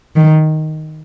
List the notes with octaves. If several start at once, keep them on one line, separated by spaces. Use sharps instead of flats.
D#3